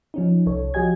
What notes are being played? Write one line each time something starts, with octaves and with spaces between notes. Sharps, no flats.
F3 C#4 D#4
C2 A4 C#5
F3 F#4 G4 D#5 G#5 G#6